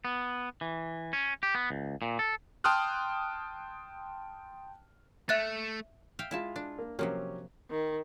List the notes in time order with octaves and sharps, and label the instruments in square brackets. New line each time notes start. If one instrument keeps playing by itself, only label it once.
[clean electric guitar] B3
E3
C#4
G4
B3
C#2
A#2
A4
[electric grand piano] G5 A5 C6 D#6 F6 F#6
[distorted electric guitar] A3 [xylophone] E5 F#6 A6
[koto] E5 F5 G5
[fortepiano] G#3 F4 [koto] E4 E5 A5
[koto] D4
[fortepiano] A#3
[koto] C3 F3 A#3 [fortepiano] F#3 C#4 G4
[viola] D#3